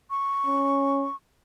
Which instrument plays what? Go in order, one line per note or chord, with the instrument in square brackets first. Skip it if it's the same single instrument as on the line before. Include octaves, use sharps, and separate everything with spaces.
[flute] C#6
[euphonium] C#4